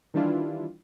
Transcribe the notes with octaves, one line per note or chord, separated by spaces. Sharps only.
D#3 E3 G3 D4 E4 F4